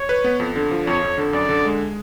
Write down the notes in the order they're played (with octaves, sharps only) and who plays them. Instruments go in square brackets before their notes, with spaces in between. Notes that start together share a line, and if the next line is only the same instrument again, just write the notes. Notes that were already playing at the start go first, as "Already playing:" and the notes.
Already playing: [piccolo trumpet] C#5
[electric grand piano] B4
B3
F2
D3
F3
[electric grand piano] F2 [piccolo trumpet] C#5
[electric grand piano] F2
D3
[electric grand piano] F#2 [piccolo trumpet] D5
[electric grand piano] D3
G#3